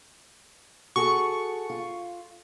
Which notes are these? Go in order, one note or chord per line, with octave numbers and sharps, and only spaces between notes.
F#4 G#4 A4 C#6
F4